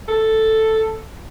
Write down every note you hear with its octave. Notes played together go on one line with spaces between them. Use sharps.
A4